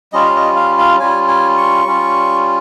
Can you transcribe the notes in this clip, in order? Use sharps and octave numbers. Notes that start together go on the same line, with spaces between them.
G3 C#4 F4 D#5
F5
D#5
F5
F5
G3 C#4 F4 G#5
G#5
C#6
G3 C#4 F4